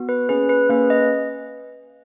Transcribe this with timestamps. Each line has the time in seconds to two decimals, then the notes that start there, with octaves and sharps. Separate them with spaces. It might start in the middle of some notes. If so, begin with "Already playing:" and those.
Already playing: B3 F#4
0.09 B4
0.29 A#3 C#4 G#4 B4
0.49 B4
0.69 A#3 C#4 G#4 B4
0.90 D#5